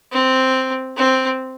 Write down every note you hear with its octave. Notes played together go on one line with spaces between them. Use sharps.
C4
C4